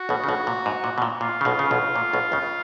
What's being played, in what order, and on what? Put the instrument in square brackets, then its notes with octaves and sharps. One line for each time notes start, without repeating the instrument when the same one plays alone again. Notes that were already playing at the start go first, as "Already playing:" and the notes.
Already playing: [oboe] F#4
[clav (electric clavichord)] B1 B2
C#3
B1 B2
A#2
G#2
A#2
B2
A#2
[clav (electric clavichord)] A#2 [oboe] F4
[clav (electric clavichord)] C#3
B1 B2
C#3
B1 B2
A#2
B1 B2
C#2 C#3